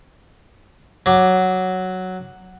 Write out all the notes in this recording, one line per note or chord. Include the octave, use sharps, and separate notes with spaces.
F#3 D6